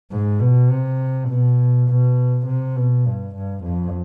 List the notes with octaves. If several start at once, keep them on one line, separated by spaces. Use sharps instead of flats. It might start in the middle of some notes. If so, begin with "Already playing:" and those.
G#2
B2
C3
B2
B2
C3
B2
G2
G2
F2